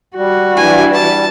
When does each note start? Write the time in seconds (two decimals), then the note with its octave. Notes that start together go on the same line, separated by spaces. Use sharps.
0.16 G3 F#4
0.57 E3 D4 E4 G#5
0.94 A5